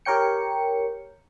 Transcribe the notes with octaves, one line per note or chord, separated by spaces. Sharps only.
G4 A#4 C#5 G5 C#7